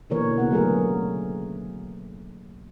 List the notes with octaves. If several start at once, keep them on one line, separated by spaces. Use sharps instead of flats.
B2 D3 E3 A#3 A#4 C#5
C#3 B3 F#5
D3 F#3 A3 G#4 A#4